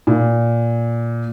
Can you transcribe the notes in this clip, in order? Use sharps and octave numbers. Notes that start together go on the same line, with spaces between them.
A#2